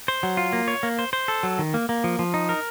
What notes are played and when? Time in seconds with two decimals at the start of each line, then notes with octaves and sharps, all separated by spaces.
0.08 C5
0.23 F#3
0.37 F4
0.53 A#3
0.68 C#5
0.83 A#3
0.99 C5
1.13 C5
1.28 A4
1.43 F#3
1.59 D#3
1.74 A#3
1.89 A#3
2.04 F3
2.19 F3
2.34 D#4
2.49 A#4